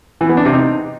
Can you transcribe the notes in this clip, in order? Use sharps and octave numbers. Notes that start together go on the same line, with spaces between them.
E3
B3
D4
C3
D#4